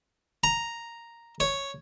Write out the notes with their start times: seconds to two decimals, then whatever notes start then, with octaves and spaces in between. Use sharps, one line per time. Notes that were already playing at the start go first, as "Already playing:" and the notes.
0.44 A#5
1.40 C#5